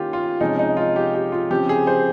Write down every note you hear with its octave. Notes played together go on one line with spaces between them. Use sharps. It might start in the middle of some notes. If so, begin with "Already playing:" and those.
Already playing: D#3 A#3 C#4 F4 G4
F4
C3 F3 G#3 C#4 D#4
D#4
F4
G4
G4
F4
C#3 F3 C4 G4
G#4
C5